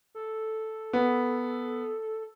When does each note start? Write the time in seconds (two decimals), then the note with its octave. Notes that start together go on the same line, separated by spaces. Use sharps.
0.15 A4
0.93 B3